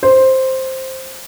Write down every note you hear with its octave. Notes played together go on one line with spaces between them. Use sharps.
C5